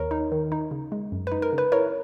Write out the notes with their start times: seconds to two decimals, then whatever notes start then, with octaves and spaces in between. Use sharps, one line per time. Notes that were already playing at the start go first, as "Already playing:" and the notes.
Already playing: D#2 A#4 C#5
0.11 D#4
0.32 D#3
0.52 D#4
0.71 C#3
0.92 G#3
1.12 F#2
1.27 D#4 B4
1.42 A#4
1.52 C#3
1.58 B4
1.72 E4 A#4 C#5